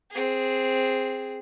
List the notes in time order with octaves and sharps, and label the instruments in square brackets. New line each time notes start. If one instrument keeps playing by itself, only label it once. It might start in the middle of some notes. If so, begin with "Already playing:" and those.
[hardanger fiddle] C4 G#4